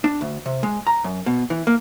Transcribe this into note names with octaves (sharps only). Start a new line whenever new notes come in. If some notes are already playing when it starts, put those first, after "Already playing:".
D4
D2
C3
G#3
A#5
F#2
B2
E3
A#3